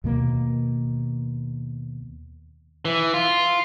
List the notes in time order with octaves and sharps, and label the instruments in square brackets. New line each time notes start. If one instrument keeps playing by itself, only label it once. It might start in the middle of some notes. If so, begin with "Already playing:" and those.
[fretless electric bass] D#2 B2 A#3
[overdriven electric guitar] E3
F4